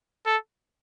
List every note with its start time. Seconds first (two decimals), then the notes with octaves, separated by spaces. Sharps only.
0.26 A4